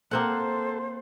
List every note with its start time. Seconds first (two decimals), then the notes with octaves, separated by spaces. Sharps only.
0.11 A#3 C4 A4 C5 F#5